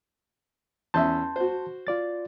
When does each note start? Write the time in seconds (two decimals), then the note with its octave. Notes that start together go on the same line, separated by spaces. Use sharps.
0.94 E2 C#4 E5 A5 C6 G6
1.36 F#4 C5
1.87 F4 D5 A6